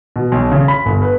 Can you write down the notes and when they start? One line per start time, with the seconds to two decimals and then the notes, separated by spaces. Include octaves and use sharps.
0.16 B2
0.32 B1
0.52 C#3
0.68 B5
0.86 G1
1.02 B4